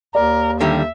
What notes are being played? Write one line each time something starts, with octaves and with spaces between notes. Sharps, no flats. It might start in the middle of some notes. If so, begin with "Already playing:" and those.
D#2 A#4 D5
D3 D#3 G3 E5